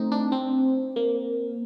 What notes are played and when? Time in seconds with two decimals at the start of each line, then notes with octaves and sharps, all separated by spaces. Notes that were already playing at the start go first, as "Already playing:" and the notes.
Already playing: A3 C4 D#4
0.12 D4
0.32 C4
0.96 A#3